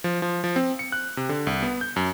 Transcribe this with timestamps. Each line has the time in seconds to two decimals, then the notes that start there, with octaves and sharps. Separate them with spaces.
0.04 F3
0.22 F3
0.44 F3
0.56 C4
0.79 C#7
0.92 F#6
1.17 C3
1.29 D3
1.47 C2
1.63 B3
1.81 G6
1.96 F#2